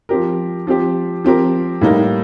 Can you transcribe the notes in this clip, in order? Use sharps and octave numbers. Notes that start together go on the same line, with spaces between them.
F3 C4 G4 A#4
F3 C4 G4
F3 C4 G4 A#4
A2 G3 A#3 D#4